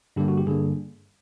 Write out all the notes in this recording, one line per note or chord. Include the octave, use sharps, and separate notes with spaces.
G2 D3 G3 A#3 G4
F#4
G4
G2 D3 G3 A#3 G#4